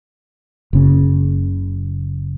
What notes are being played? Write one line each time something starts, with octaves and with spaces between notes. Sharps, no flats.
F#1 C#3